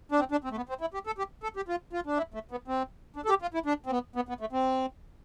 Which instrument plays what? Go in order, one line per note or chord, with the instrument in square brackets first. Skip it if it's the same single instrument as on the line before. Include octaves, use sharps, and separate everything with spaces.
[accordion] D4
C4
D4
C4
A3
B3
C4
E4
G4
A4
G4
A4
G4
F4
F4
D4
E4
A3
B3
C4
D4
A4
G4
F4
E4
D4
C4
B3
B3
B3
A3
C4